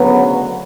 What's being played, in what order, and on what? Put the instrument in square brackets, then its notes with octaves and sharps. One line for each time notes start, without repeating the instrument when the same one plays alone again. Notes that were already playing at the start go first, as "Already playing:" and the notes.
Already playing: [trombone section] D2 C#3 F#3 B3